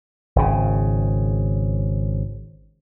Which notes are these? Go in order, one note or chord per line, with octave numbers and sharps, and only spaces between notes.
G#1 C#3